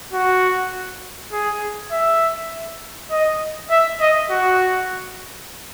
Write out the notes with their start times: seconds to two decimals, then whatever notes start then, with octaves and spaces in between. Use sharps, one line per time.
0.13 F#4
1.32 G#4
1.92 E5
3.11 D#5
3.70 E5
4.01 D#5
4.30 F#4